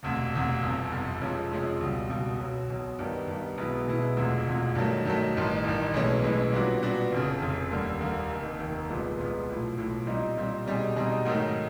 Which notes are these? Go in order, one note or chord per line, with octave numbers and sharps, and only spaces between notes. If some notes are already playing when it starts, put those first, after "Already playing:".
E1 D2 C3
E1 D2 C3
G1 F2 C3
G1 F2 C3
F2 C3 F3 G#3 C#4
F2 C3 F3 G#3 C#4
C#2 B2 G3
C#2 B2 G3
B1 B2 F#3
B1 B2 F#3
G2 D#3 G3 B3
G2 D#3 G3 B3
B1 B2 G#3 B3 E4
B1 B2 G#3 B3 E4
E1 D2 C3 F3 G#3
E1 D2 C3 F3 G#3
G2 D#3 F#3 A3
G2 D#3 F#3 A3
A1 G2 D#3
A1 G2 D#3
B1 A2 E3 G#3 C#4
B1 A2 E3 G#3 C#4
A#2 G3 B3 D4 F#4
A#2 G3 B3 D4 F#4
F1 F2 C#3
F1 F2 C#3
D#2 D3 G3 A#3
D#2 D3 G3 A#3
F1 D#2 D#3
F1 D#2 D#3
C2 A#2 F3 G#3 B3
C2 A#2 F3 G#3 B3
B1 A2 F3
B1 A2 F3
A#2 G3 C4 D#4
A#2 G3 C4 D#4
B2 G3 C4 D#4 G#4
B2 G3 C4 D#4 G#4
G#2 D#3 F#3 A3